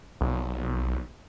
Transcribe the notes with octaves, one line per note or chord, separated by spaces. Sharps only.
B1